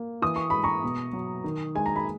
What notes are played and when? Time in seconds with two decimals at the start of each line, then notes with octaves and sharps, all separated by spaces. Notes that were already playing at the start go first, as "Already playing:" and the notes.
Already playing: A#3
0.22 E3 D#6
0.36 C#6
0.50 G#3 B5
0.64 A#5 C#6
0.84 B2
1.13 F#3
1.44 D#3
1.75 G#3 G#5
1.86 A#5
1.96 B5